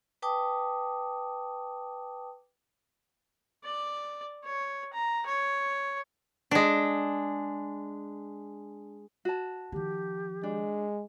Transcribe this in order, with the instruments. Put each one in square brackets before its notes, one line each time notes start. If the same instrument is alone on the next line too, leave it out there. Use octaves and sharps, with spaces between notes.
[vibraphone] B4 G5 A5 D6 D#6
[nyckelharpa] D5
C#5
A#5
C#5
[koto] G#3 D4
[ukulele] F#4 A5
[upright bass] D#3 F3 [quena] G4
[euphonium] G#3 [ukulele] D4